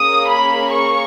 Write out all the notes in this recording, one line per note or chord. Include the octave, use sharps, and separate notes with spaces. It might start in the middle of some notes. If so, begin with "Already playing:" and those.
Already playing: A#3 C#4 G#4 D#6
B5
C#6